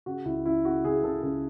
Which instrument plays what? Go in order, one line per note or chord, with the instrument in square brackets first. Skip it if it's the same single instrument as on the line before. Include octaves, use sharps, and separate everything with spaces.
[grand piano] C#3 F#4
C#2 E4
C#2 E4
C#3 F#4
C#3 G#4
C#3 A4
C#2 A4